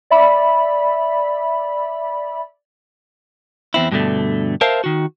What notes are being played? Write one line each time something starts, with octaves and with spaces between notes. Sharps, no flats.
D5 E5 B5
E2 C4 E4
G2 B2 D3 A3
A#4 C5 E5 F5 A5
D#3 F#4